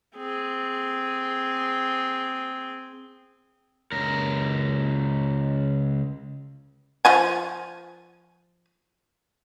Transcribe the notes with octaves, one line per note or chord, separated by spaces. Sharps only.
C4 G#4
C#2 A#4
F3 F4 G#5